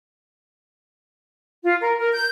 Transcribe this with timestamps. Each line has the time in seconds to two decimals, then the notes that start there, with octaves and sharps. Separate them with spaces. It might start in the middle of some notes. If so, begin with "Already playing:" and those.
1.64 F4
1.81 A#4
1.97 A#4
2.13 G6